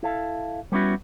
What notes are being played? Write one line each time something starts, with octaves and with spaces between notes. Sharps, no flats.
E4 A4 F5
G3 B3 C#4 E4 F#4